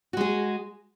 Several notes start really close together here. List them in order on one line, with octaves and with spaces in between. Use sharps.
F#4 G#3 G#4